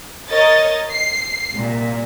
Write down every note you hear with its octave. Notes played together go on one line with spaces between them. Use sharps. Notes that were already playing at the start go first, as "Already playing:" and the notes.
A#4 C#5 D#5 A6
C7
C2 A#2